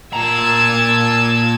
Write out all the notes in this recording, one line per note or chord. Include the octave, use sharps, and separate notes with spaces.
A#2 A5 A#5 E6 G#6